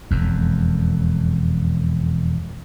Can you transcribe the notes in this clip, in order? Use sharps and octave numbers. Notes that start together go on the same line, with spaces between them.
E1 F2